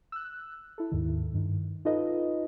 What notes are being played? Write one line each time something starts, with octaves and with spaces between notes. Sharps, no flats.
E6 F#6
E4 A4
D#2 G#2 D#3
G2 D#3
D#4 F4 A4 B4 D#5